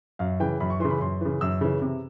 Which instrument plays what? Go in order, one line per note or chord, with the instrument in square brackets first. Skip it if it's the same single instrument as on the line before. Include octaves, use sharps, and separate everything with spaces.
[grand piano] F#2 F5
C#3 E3 G5
F#2 B5
C#6
E3 C6
C#3
B5
F#2 C6
C#3 E3
F#2 E6
C#3 E3
C3